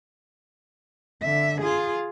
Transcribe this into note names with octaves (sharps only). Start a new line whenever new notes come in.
D3 E5
F4 G#4